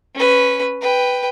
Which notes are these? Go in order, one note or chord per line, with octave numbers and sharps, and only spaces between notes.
C#4 B4
B4 G5